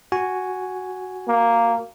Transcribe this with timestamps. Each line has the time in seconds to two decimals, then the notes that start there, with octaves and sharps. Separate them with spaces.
0.12 F#4 G#5
1.28 A#3